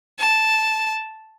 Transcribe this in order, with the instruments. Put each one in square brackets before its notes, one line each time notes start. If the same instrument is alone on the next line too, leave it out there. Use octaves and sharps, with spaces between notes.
[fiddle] A5